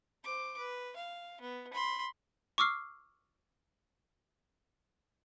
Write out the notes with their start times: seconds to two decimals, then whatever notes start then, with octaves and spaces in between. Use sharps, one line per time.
0.24 C5 D6
0.58 B4
0.96 F5
1.41 B3
1.73 B5 C6
2.58 C#6 D6 E6 F6 C7